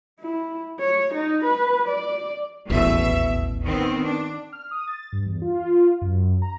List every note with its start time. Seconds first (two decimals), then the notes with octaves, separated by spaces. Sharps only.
0.20 E4
0.80 C#5
1.14 D#4
1.44 B4
1.88 D5
2.70 D#1 A1 E2 B2 E5
3.64 D#3 B3 C4
4.05 D4
4.52 F6
4.71 D#6
4.87 A6
5.12 G2
5.26 E2
5.42 F4
6.01 F#2
6.42 A#5